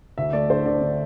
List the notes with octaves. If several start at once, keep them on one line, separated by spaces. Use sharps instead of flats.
D2 E5
A3 D5
D3 C5
D3 D5
D3